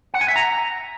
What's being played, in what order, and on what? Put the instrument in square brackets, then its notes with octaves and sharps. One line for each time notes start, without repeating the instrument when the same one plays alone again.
[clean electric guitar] F#5
G#5
E5
A#5